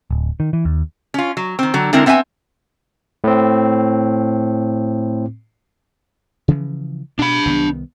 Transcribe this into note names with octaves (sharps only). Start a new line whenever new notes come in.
D1
D#3
E3
D#2
C#4 F4
F#3
D#3 C4
D3 F#3
D3 G#3 C4 E4 A#4
B3 C4 E5 F5 G#5
A2 C4
C#3 E3 F3
B2 D4 B5
C2 D#3 B3